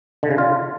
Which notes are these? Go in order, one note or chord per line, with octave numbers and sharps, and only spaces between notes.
D3
C#3
F4